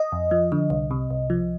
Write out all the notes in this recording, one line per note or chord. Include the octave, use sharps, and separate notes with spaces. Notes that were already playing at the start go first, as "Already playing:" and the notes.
Already playing: D#5
F2
F3
D3
C2
C3
C2
F3